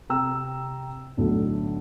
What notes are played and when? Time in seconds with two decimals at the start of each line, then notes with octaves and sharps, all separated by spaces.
0.09 C3 G5 A#5 E6
1.17 B1 A2 D3